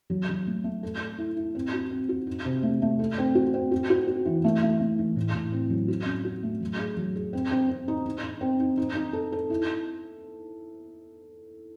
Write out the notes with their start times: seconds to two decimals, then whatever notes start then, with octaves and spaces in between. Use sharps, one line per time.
0.10 F#3
0.29 F#3
0.47 A3
0.64 A3
0.83 A4
1.00 A4
1.18 E4
1.37 E4
1.55 C4
1.73 F#4
1.91 C4
2.09 F#4
2.27 D#4
2.45 C3
2.63 A3
2.82 A3
2.99 A4
3.18 C4
3.35 F#4
3.54 C4
3.71 F#4
3.90 F#4
4.07 F#4
4.25 E3
4.44 A3
4.63 A3
4.80 A3
4.99 E3
5.16 A2
5.35 A2
5.52 C4
5.70 F#3
5.88 F#4
6.06 C#4
6.25 F#4
6.43 A3
6.60 F#3
6.79 G#4
6.97 F#3
7.15 G#4
7.33 C4
7.51 C4
7.69 C4
7.88 D#4
8.06 D#4
8.24 D#4
8.41 C4
8.60 D#4
8.77 D#4
8.95 D#4
9.13 A4
9.32 A4
9.50 E4